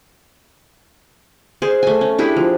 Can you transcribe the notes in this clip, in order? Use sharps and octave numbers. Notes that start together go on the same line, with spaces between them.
G#4 C5 D5
A3 G#5
C#4
D4 E4 G4 G#4
F3